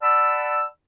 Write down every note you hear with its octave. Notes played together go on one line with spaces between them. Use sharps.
D5 F#5 A5 B5 E6